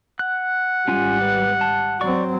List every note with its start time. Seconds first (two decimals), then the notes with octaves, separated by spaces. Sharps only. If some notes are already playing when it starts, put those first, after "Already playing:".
0.19 F#5 F#6
0.88 G#1 G3 C#4 F4 G#5
1.21 B4
1.61 A5
2.01 F#3 C4 D5 C#6